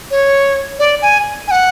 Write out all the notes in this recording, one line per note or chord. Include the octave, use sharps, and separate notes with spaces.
C#5
D5
G#5
G#5
F#5